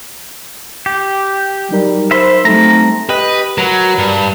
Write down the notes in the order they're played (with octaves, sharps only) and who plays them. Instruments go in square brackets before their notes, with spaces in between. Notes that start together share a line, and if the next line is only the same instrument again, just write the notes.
[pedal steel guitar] G4
[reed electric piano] F#3 D#4 A#4 [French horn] G3
[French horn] C5 [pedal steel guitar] E5 B5 C6
[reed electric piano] F#3 G3 D#4 [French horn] A3 [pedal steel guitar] C4 A#5
[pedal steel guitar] G4 D#5 [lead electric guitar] B4
[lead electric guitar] F#3 [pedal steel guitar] A#4 B4 A#5
[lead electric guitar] G2